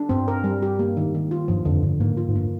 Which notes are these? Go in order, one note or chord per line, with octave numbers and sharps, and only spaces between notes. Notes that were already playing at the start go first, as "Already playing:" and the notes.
Already playing: D4
G2 C4
A#4
G3
G4
A#3
D#3
D#3
F4
G2 F3
F2 D3
G2 D3
G#2 A#3
F4
G#2
G2 A#3